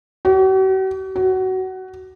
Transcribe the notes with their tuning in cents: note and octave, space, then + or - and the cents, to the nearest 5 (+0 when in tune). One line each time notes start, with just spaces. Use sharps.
F#4 +45
F#4 +20